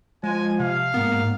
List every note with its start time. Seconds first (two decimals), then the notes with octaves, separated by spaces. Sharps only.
0.24 F3 G#3 G#5
0.60 C3 F5
0.94 G#2 A#3 B3